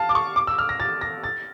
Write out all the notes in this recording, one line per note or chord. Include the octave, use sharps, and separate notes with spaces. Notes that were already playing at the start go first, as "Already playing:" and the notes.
Already playing: F5 A5
D6
C#6
D6
E6
F6
A#6
A6
A#6
A6